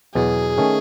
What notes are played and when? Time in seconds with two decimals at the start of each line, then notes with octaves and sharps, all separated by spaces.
0.14 E2 B2 F#3 G#4
0.58 D#3 A3 C#4